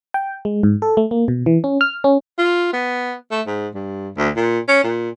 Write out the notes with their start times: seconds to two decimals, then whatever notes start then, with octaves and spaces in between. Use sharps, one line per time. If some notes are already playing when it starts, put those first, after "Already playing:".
0.14 G5
0.45 G#3
0.63 G#2
0.82 A4
0.97 A3
1.11 A#3
1.28 B2
1.46 E3
1.64 C#4
1.81 F6
2.04 C#4
2.38 F4
2.73 B3
3.31 A3
3.47 G#2
3.74 G2
4.17 D2
4.37 A#2
4.68 C#4
4.84 A#2